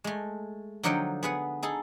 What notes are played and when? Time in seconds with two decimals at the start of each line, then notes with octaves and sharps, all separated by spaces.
0.04 G#3 A3
0.83 D3 F3 F#3 D#4 F#5 G5
1.23 B3 G#4 B4 F#5
1.62 D#4 G#4 A4